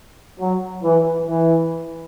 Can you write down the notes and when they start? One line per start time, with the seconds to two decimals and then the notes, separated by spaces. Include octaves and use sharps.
0.40 F#3
0.83 E3
1.28 E3